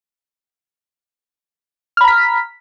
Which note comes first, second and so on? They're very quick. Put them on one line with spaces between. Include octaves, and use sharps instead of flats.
F6 B5 A#5 B6